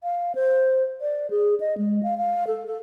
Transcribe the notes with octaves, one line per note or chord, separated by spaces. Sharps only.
F5
C5
D5
G#4
D#5
G#3
F5
F5
A4
A4